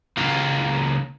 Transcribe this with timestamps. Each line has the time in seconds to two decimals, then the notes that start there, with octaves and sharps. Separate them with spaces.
0.18 C#2 A#3